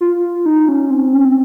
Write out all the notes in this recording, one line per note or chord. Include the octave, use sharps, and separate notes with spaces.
F4
D#4
C#4
C4
C#4
C4